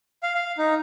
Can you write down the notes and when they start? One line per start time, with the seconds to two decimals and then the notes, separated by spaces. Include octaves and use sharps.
0.23 F5
0.35 F5
0.58 D#4